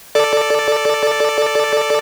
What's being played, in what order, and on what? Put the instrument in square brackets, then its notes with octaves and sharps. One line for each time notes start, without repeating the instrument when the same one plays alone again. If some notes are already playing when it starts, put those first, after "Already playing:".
[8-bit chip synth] A4 D5